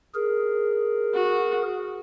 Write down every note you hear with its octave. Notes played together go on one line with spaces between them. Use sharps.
G#4 A#4
F#4